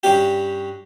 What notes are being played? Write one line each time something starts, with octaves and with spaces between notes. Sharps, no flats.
G2 C#4 G4